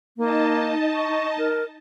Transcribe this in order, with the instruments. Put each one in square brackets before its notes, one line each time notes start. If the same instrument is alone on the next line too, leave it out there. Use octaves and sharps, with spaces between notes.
[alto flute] A#3 [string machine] D#4 D#5 A5
[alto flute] C#6
A#4